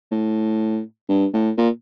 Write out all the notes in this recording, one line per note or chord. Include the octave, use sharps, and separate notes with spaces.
A2
G2
A2
A#2